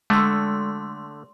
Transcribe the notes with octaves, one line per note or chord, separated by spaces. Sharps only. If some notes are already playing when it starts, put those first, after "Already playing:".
D3 G#3 A3 C6